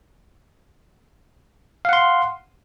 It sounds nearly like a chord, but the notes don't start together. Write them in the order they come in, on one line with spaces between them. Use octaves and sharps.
F5 F#5 C6